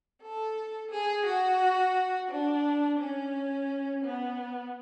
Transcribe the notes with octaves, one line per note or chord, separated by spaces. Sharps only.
A4
G#4
F#4
D4
C#4
B3